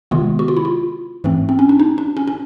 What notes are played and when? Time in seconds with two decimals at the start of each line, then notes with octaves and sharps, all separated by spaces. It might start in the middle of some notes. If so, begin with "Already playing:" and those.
0.11 C3 D#3 G#3 B3 F4
0.39 F#4
0.48 F4
0.57 E4
0.65 F4
1.24 G#2 E3 A3 C4
1.49 C4
1.59 C#4
1.69 D4
1.79 D#4
1.98 D4
2.17 C#4
2.27 C#4